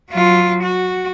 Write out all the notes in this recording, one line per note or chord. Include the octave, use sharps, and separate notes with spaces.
F#3 F4
F#4